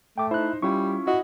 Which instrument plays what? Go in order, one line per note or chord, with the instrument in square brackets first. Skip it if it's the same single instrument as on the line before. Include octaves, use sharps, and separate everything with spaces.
[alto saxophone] A3 [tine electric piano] G5 D6
[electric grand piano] D#4 C5 [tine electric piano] E4 F#6
[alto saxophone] G3 [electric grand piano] C#4 E4 [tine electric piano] F4 C#6
[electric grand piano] E4 D#5 [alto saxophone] F#4